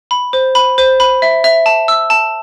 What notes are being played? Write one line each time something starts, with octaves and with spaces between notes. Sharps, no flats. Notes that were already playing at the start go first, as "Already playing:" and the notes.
B5
C5
B5
C5
B5
E5
E5
A5
E6
A5